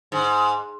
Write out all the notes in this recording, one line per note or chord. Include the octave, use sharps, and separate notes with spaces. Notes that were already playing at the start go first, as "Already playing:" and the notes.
G#2